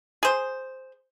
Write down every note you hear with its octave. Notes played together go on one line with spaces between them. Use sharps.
G#4 C5